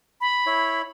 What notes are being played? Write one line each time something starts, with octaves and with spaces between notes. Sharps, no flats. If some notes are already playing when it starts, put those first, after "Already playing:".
B5
E4 C#5